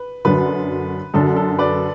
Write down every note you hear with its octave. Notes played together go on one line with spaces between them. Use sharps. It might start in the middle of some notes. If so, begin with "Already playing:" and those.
Already playing: B4
F#2 D3 F#3 B4
F#2 D3 F#3 A4
A4
B4 D5